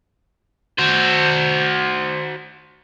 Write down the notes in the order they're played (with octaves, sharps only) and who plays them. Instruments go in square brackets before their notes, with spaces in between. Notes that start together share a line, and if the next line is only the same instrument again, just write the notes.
[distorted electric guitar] F#4 C5